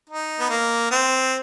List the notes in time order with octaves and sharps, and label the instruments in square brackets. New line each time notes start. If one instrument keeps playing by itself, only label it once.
[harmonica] D#4
B3
A#3
C4